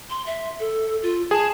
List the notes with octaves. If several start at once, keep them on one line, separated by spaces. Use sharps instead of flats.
C6
E5
A4
F4
G#4 A5